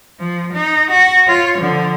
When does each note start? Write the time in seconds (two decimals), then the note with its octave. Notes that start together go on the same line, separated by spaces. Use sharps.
0.20 F3
0.54 D#4
0.91 F#4
1.27 F4 C#5
1.59 D3 F3